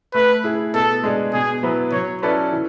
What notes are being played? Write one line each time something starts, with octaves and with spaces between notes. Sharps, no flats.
A3 B4
E4 G#4
B2 A4
G#3 D4 G#4
B2 G#4
F#3 B3 E4 B4
F#3 C#5
C#4 E4 A4 B4 D5
E3